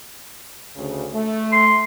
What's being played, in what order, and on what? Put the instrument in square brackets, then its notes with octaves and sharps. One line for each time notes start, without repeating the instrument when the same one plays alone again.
[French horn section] D2 C#3
A3
[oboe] C6